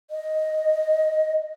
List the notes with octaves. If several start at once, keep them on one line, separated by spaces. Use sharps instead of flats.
D#5